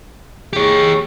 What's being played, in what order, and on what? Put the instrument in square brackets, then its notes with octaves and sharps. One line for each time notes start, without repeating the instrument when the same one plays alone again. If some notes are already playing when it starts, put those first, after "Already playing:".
[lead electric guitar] G4 C#5 [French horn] G#4